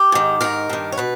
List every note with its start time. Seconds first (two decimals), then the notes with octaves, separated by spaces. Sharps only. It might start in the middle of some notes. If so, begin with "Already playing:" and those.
Already playing: G4
0.12 G#2 D#3
0.41 G#2 D#3 A#4
0.70 G2 D#3
0.92 C#5
0.97 B2 B4